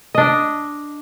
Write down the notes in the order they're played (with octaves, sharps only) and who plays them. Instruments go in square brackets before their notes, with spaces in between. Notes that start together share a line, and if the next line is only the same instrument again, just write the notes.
[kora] D4 D#5